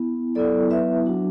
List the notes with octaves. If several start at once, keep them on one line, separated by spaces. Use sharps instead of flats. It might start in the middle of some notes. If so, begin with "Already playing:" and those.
Already playing: B3 E4
F#3 B3 E4 A4 D5
B4 E5
F#3 D4 F#4